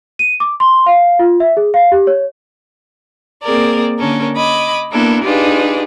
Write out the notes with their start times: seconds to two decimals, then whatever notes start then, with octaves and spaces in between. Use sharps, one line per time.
0.19 D#7
0.40 D6
0.60 C6
0.86 F5
1.19 F4
1.40 E5
1.57 G#4
1.74 F5
1.92 G4
2.07 C#5
3.43 A#3 C4 G#4 A#4 D5
3.99 D3 A#3 C#4 A4 A#4
4.35 D#5 B5 D6 G#6
4.92 A#3 B3 D4 E4 A4 A#4
5.23 D4 D#4 F4 G4 G#4 B4